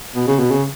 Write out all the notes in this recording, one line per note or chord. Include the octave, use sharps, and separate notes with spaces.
B2
C#3
B2
C#3